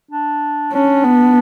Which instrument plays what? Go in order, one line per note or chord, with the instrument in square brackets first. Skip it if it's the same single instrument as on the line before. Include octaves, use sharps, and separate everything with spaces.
[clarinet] D4
[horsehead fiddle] C#4 [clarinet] D4
[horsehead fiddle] B3